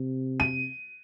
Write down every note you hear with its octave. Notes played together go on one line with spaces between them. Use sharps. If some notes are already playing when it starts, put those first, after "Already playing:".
Already playing: C3
D#7